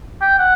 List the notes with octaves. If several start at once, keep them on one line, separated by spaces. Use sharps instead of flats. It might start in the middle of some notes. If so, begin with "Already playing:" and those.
G5
F#5